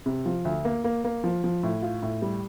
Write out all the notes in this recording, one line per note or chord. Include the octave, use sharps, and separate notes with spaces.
C3
F3
D2
A#3
A#3
A#3
F3
F3
A2
F4
A2
G3